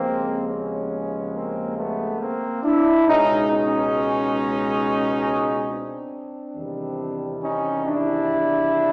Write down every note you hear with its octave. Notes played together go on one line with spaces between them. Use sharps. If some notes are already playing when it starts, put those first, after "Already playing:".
Already playing: D#2 C#3 F3 G#3 A#3 C4
B3 C#4
A#3 C4
A3 B3
A#3 C4
D4 E4
C#2 B2 G#3 C#4 D#4
C#4 D#4
C4 D4
E2 C3 D#3 G3
C#4 D#4
D4 E4